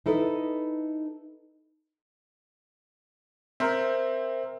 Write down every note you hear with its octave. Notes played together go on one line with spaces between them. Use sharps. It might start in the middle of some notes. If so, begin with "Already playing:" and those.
D#4 E4 A4 B4 C#5 D#5
C4 A#4 C5 E5